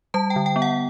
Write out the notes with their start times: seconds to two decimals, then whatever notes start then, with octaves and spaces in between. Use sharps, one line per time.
0.14 G3 A5
0.30 G5
0.36 D3
0.46 G5
0.56 B3
0.62 F#5